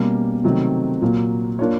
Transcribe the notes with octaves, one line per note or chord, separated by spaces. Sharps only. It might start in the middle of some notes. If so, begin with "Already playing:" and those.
Already playing: B2 G3 A#3 C#4
C3 D#3 F#3 A3 C4
A#2 F#3 A#3
A#3 D4 F4 A#4 C#5